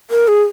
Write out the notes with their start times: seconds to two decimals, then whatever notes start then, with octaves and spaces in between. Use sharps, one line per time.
0.10 A#4
0.28 G#4